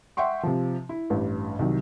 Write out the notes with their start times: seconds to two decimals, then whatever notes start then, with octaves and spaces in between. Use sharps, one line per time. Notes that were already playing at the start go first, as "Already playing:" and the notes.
0.17 E5 F#5 G5 C6 C#6
0.43 C3 F3
0.89 E4
1.10 A1 G2
1.59 C2 D#3 F#3